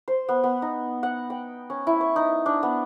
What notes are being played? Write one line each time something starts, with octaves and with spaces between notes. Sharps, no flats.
C5
B3
B3
D#4
F#5
G5
C#4
E4
C#6
D#4
D4
B3